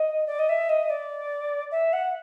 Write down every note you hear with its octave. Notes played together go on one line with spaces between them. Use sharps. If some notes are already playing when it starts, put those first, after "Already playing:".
Already playing: D#5
D5
D#5
E5
D#5
D5
E5
F#5